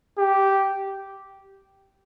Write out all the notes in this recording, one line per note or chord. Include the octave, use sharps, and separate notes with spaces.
G4